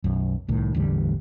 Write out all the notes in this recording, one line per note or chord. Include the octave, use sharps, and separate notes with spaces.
B1 F#2
C2 A2 D#3
A1 E2 D3 G3